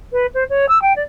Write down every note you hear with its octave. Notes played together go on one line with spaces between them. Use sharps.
B4
C5
C#5
E6
G5
D5